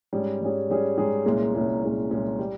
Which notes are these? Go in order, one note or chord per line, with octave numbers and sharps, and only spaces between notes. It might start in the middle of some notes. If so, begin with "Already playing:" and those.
G#2 G3 C#4 G#4
G#2 G3 C#4 G#4
G#2 G3 C#4 G#4
G#2 G3 C#4 G#4
C2 A#2 G#3 C#4
C2 A#2 G#3 C#4
C2 A#2 G#3 C#4
C2 A#2 G#3 C#4
G3